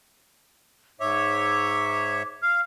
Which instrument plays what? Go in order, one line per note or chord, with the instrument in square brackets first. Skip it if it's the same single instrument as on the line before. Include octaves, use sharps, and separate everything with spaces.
[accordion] G#2 C#5 E5 [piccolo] D6
[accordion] F5 [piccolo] F6